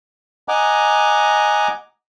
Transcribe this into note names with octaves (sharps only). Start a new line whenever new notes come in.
D#5 F#5 G#5 A#5 D6